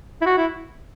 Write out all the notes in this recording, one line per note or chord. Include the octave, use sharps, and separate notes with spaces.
E4
F#4
E4